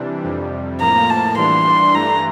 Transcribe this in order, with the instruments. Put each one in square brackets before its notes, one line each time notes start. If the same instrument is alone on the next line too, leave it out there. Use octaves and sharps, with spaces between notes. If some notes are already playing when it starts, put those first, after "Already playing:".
Already playing: [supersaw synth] C3 E3 G3 D4
F2 C3 G3
[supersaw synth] A2 F3 A#3 [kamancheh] A#5
[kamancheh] A5
[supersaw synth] E3 G3 D4 [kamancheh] C6
[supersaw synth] G2 E3 A3 [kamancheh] A#5